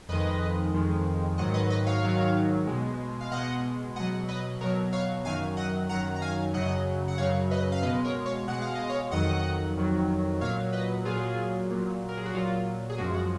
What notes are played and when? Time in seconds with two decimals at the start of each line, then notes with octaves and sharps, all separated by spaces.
0.09 F2 D#3 G#3 B4 D#5
0.74 F2 D#3 G#3
1.38 G#2 D#3 F#3 D#5 F#5
1.54 B4 D#5
1.70 B4 D#5
1.86 C#5 F5
2.03 G#2 D#3 F#3
2.67 B2 G#3
3.21 F5
3.31 B2 G#3 D#5 F#5
3.96 B2 F#3 D#5 F#5
4.28 B4 D#5
4.61 B2 F#3 A#4 C#5
4.92 C#5 F5
5.24 F#2 D#3 F#3 F5 G#5
5.57 D#5 F#5
5.89 F#2 D#3 F#3 F#5 A#5
6.16 A#5
6.22 F5 G#5
6.53 F#2 C#3 F#3 D#5 F#5
7.08 F#5
7.18 F#2 C#3 F#3 C#5 F5
7.51 B4 D#5
7.72 F5
7.82 B2 G#3 B4 D#5
8.04 A#4 C#5
8.26 C#5 F5
8.47 B2 G#3 F#5
8.62 F5
8.75 D#5
8.89 C#5 F5
9.11 F2 D#3 F#3 D#5 F#5
9.76 F2 D#3 F#3
10.41 A#2 F#3 C#5 F5
10.73 B4 D#5
11.05 A#2 F#3 F4 G#4
11.70 A#2 F#3
12.09 A#4
12.17 G#4
12.26 F#4
12.35 A#2 F#3 F4
12.90 G#4
12.98 F#2 F3 G#3 F#4
13.14 F#4